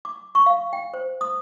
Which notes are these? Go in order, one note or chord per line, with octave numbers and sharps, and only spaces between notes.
D6
C#6
F5
G5
C5
D#6